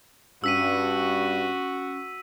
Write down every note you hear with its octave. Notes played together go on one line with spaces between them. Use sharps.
G2 C#4 F#4 C#6 E6 B6 D#7